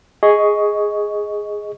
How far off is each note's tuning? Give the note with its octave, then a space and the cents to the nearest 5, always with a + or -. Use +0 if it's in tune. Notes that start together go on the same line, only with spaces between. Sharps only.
G#4 +0 D#5 +10 C#6 +10